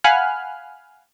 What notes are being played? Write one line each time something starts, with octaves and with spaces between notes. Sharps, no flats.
F5 F#5 G#5 B5 F6 F#6